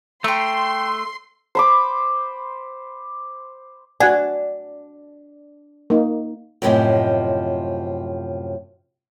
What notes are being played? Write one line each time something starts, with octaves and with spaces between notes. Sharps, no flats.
A3 G5 A#5 C6
C5 B5 D6
D4 F#4 F#5 G#5
A#3 D#4
F#2 A2 C3 F3 D#5 G#5